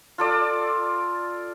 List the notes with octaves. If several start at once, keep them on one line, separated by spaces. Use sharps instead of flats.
F4 A4 D5